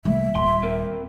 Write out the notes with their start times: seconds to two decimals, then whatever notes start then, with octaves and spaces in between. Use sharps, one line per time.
0.05 C2 E3 G3 A3 A#3 E5
0.35 D#1 D#2 A#2 G3 C6
0.63 C4 A#4